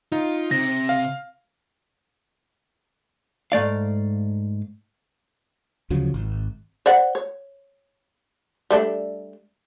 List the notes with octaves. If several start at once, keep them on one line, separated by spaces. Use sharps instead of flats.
D#4 F4
C3 A#6
F5
G#2 A3 D5 F5
D2 C#3 F3 F#3
G#1
C5 D5 F#5
C#5
G3 A3 D4